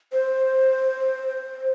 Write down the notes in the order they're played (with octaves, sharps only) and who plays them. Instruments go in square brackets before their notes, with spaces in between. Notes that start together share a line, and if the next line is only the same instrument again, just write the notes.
[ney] C5